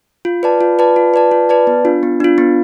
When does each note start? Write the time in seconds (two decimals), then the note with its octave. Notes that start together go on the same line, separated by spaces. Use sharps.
0.25 F4
0.43 B4 D5 A5
0.61 F4
0.79 B4 D5 A5
0.96 F4
1.14 B4 D5 A5
1.32 F4
1.49 B4 D5 A5
1.67 B3
1.85 D4 F4
2.03 B3
2.20 D4 F4
2.38 B3